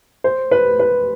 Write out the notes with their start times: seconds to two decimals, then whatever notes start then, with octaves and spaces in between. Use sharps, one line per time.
0.24 C5
0.51 B4
0.79 B4